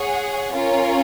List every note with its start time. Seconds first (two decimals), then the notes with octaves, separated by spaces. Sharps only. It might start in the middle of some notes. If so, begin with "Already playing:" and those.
Already playing: G#4 C#5 F#5
0.52 C#4 F4 A#4 C#5